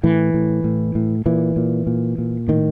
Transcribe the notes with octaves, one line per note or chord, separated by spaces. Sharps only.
A2 E3
A2
A2
A2
A#2 E3
A#2
A#2
A#2
A2 D#3